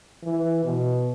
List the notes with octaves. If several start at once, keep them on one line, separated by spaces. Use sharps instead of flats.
E3
B2